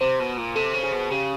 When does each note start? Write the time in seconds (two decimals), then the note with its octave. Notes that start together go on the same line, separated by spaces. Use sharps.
0.01 C3 C5
0.20 B2
0.37 A#2
0.56 C3 A4
0.73 C#3
0.83 G#4
0.92 B2
1.11 C#3 G4